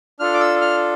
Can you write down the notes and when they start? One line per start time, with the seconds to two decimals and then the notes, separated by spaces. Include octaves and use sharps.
0.20 D4 F4 A4 F6
0.34 D6
0.40 E6
0.61 F6